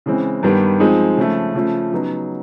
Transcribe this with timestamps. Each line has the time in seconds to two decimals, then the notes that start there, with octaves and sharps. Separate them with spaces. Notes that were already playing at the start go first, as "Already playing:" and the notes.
0.06 C#3 E3 G#3 C4
0.43 G2 D#3 G3 B3
0.80 F3 G#3 C4 D#4 G#4
1.17 C#3 F3 A3
1.55 C#3 F3 A3
1.92 C#3 F#3 B3 D#4